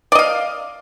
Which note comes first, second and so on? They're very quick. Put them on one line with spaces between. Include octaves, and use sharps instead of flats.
D5 D#5 F5